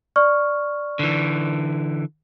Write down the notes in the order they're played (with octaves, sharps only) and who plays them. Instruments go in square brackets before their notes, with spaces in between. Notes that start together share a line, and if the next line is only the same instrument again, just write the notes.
[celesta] D5 C#6 F6
[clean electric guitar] D3 E3